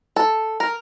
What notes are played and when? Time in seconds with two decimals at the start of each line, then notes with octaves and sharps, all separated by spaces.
0.16 A4
0.60 A#4